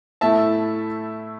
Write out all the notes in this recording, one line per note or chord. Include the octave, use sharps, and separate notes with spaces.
A2 A3 E4 E5 A5